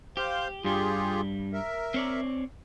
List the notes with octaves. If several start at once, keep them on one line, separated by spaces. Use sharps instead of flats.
G4 C5 F5
G2 G3 F4 G4 G#4
A#4 E5
C4 C#5 D5